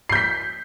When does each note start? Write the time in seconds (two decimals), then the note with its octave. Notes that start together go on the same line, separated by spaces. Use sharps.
0.09 C7
0.12 G6
0.15 B6